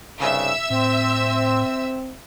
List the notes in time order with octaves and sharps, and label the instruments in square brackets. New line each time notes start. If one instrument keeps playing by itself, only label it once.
[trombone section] C2 G2 C#3 [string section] E5 E6
[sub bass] A2 [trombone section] C4